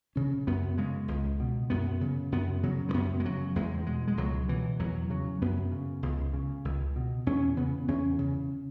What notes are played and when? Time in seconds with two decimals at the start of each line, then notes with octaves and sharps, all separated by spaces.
0.16 C#3 C#4
0.47 F#2 B3
0.78 C#3 G#3
1.08 C#2
1.40 B2
1.70 F#2 B3
2.01 C#3
2.32 F#2 B3
2.63 C#3 F#3
2.89 G#3
2.94 F#2 B3
3.20 G#3
3.25 C#3 F#3
3.56 E2 G#3
3.86 B2 G#3
4.08 G#3
4.17 C#2 F#3
4.49 B2 E3
4.80 E2 F#3
5.10 C#3 F#3
5.42 F#2 B3
5.72 C#3
6.03 C#2
6.34 C#3
6.65 C#2
6.96 B2
7.26 E2 C#4
7.57 C#3 B3
7.88 E2 C#4
8.19 C#3